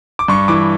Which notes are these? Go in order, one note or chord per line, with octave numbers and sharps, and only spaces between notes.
D6
G2 C#6
E3 D6